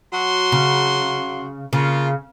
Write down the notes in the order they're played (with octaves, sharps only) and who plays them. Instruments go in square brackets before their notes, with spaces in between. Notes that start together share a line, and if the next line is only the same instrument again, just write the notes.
[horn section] F#3 F#4 C6
[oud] C#3
[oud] C#3 [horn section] A#3 F4